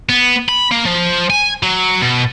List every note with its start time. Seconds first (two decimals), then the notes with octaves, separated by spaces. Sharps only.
0.09 B3
0.49 B5
0.72 A#3
0.86 F3
1.30 G#5
1.63 F#3
2.01 B2